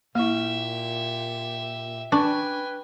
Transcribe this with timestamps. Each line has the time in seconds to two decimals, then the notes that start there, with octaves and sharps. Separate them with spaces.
0.15 A#2 A#3 E4 G4 E5
2.12 D4 B4 G5 G#5 C#6